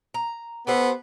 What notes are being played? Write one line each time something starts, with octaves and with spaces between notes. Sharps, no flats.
A#5
B3 G4 A4 C5